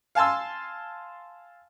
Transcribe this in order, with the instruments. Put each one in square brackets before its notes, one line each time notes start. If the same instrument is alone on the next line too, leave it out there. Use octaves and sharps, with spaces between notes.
[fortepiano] F5 G#5 A5 C6 E6